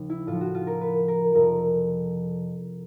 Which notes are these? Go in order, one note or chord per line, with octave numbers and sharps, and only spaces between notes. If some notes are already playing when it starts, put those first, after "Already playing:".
Already playing: D#2 C#3 F3
E4
A2 F3 F4
F#4
F4
A#4
B4
A#4
F2 C3 F3 A#4